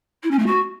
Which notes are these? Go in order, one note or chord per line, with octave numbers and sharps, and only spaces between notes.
E4
C#4
A3
F#4